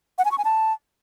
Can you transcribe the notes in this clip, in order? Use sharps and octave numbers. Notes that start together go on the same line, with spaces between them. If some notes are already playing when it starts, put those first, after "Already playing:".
F#5
G#5
C#6
G#5
A5